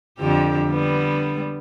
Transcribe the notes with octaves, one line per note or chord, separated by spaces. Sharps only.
F2 D3 G4
D3 G3 B3